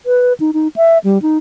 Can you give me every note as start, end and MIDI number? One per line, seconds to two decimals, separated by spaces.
0.06 0.33 71
0.40 0.51 63
0.53 0.68 63
0.76 0.98 76
1.04 1.21 55
1.22 1.38 63